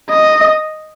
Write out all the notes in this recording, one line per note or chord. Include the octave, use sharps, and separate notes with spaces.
D#5